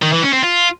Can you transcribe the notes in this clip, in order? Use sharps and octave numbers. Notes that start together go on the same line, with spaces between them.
D#3
E3
C#4
C4
F4